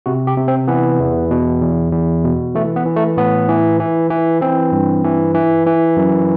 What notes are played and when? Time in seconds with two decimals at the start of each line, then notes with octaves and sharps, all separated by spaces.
0.06 C3 F#4
0.27 G4
0.37 C3
0.48 C4
0.68 E3 B3
1.00 E2
1.31 B2
1.62 E2
1.92 E2
2.24 B2
2.55 E3 A3
2.76 B3
2.86 E3
2.96 A3
3.17 A2 B3
3.49 E3
3.80 E3
4.10 E3
4.41 E3 C4
4.72 G2
5.04 E3
5.35 E3
5.67 E3
5.97 F#2